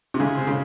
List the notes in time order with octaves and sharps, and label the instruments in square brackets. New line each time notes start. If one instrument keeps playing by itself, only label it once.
[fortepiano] C3
[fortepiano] C#3 [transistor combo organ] G#3
[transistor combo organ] C3
[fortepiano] C#3